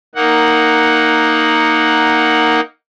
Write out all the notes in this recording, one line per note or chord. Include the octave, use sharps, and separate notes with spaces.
A#3 D#4 F#5